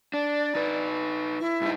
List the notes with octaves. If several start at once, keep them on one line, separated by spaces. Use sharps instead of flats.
D4 D5
D#4 B4
E4
G2 D#4